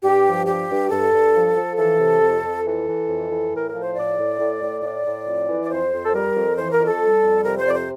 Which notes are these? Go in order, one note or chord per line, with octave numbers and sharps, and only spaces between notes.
G2 G4
F3
G2 G4
G2
G2 A4
G2
F3
F3
E3 A4
C3
F2
F2
E3 A4
E3
F2
E3
A2 A#4
A#4
F3
C5
A2 D5
A2
A2
A2
A2 D5
A2
F2
E3
D5
F2 C5
F2
A4
G3 A#4
F2
E3 C5
A#4
F2
A4
G3
F2
C3 A#4
C5
F2 D5
C5